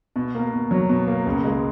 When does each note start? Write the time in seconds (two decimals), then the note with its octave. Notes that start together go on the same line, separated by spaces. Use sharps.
0.16 B2
0.35 A#3
0.53 B2
0.71 F#3
0.89 B2
1.08 A#3
1.26 C#2
1.44 G#3